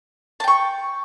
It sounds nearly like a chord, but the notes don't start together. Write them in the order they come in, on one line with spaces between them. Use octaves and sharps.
A5 G5 C#6